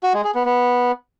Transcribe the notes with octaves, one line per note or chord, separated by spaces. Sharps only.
F#4
G#3
G#4
B3
B3